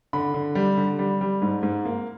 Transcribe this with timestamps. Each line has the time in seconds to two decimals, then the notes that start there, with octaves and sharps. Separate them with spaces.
0.13 D3 B5
0.34 D3
0.55 G3
0.77 D3
0.99 G3
1.21 G3
1.42 G#2
1.63 G#2
1.85 A#3